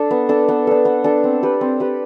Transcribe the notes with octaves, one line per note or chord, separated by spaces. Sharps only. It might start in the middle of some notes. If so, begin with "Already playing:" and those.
Already playing: D4 A4
B3
D4 A4
B3
D4 A4
B3
D4 A4
C4
G4 B4
C4
G4 B4